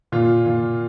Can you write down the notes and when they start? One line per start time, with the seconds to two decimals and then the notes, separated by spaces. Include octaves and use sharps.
0.12 A#2 F4
0.46 A#2